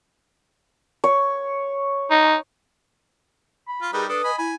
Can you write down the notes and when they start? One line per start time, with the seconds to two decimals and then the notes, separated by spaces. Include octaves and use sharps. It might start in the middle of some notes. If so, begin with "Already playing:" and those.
1.04 C#5
2.11 D#4
3.68 B5
3.82 F4
3.93 G3 D#4 G#4 A#4 B4
4.09 D4 A4 B4 D#6
4.24 D#5 G#5 B5
4.38 E4 G#5 B5